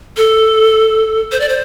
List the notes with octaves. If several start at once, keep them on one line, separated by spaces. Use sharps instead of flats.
A4
C5
D5
C5